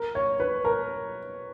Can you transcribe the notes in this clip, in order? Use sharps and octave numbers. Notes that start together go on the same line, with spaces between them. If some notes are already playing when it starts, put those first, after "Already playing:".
Already playing: A#4
C#5
B4
A#4